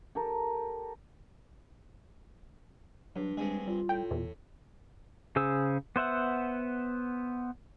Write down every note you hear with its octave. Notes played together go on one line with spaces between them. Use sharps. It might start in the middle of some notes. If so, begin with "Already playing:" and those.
G4 A4 A#4
G2 F#3 D4
G2 G#3 C4 G#4
G3 F4
A2 G5
E2 A#2
C#3 G#4 C5 E6
B3 C5 E5 F#5